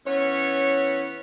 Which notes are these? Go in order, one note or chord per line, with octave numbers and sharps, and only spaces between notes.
E3 B3 C#4 C#5